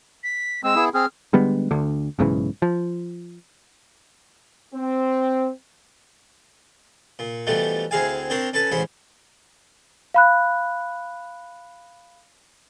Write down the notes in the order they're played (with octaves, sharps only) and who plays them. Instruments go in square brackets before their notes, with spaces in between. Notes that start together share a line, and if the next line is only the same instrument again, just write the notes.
[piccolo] B6
[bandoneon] G#3 C4 [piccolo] E6
[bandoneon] B3 E4 G#4
[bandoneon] C4 G#4 [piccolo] F6
[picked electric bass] D3 G3 G#3 B3
D2 D3
B1 G#2 C#3 E3
F3
[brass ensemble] C4
[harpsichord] A#2
B2 E3 F3 G3 A3
D2 C4 E4 G#4 F5 G#5
C4 D4 A#4 C5 C#5
C#4 A4 B4 A5
A1 G#2 C#4 C5 B5
[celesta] F5 B5 F#6